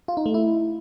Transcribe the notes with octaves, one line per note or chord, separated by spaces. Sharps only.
F4
D#4
A3
E4